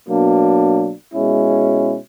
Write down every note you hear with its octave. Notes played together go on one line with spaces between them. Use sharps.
B2 F#3 A#3 D4
B2 G#3 C#4 E4